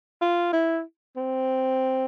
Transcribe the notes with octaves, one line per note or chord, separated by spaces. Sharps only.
F4
E4
C4